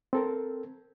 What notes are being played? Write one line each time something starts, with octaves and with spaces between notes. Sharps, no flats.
C4 A4 A#4